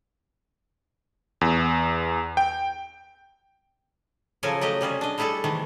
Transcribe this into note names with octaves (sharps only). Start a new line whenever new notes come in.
E2
G5
C#3 F3 F#3 A4 A#4 G#5
F#3 A3 G4 D#5
C3 G3 C#4 G#4
D4 D#5
G3 A3 E4 G#4 A4
C3 D#3 E3 A3